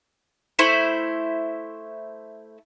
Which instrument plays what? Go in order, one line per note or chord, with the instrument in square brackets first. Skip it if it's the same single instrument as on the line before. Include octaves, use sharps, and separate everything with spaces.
[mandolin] A3 E4 C5